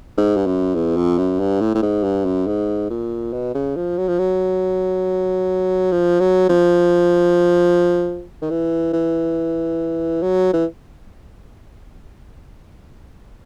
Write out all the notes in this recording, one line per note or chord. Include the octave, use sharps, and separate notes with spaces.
G#2
G2
F#2
E2
F2
F#2
G2
A2
A2
G#2
G2
F#2
G#2
A#2
B2
C#3
F3
F#3
F3
F#3
F3
F#3
F3
D#3
E3
E3
F#3
E3